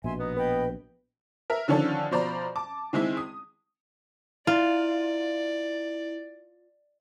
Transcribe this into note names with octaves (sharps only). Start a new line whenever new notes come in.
A#1 B2 E5 G#5 C6
B3 D#4
B4 D#5 G5 B5
A#4 E5
D3 D#3 F3 C#4 D4 A4
B2 F3 C5 D5 A#5 B5
A5 D6
D#3 G#3 C4 E4
D#6
E4 F4 D5